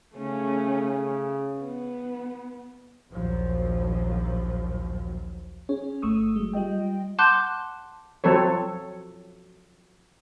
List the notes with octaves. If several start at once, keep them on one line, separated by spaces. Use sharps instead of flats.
C#3 A3 C#4
B3
A#1 D#2 F3 F#3
C#4 G#4 C#5
G1 A3 C#6 D#6 E6
F#3 G#3
G3 F4 D#5 G5
F#5 A5 C6 D6 F#6 G6
F3 F#3 C4 A4 C#5